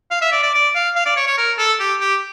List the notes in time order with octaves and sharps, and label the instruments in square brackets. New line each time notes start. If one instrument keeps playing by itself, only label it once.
[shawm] F5
E5
D5
D5
D5
F5
F5
D5
C#5
C#5
A#4
A4
G4
G4